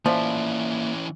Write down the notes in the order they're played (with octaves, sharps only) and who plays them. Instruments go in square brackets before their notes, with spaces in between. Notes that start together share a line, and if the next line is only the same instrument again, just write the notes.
[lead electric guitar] E3 C#4 [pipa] F3 [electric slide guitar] A#3 D5 E5